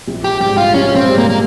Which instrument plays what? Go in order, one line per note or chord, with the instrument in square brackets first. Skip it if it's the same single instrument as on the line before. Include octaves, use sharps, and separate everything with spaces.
[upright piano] A#1
[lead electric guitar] G4
[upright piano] G#2 G3 [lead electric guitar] G4
[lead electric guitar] F4
[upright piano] A#1 [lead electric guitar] C#4
[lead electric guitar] C4
[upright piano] G#2 G3
[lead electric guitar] A#3
A#3